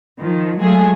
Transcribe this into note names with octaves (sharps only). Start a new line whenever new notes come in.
D#3 F3
F#3 G#3 A3 F4 G#4